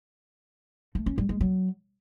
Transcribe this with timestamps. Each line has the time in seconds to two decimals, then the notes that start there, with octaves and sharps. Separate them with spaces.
0.95 A3
1.06 C#4
1.18 G3
1.29 G#3
1.41 F#3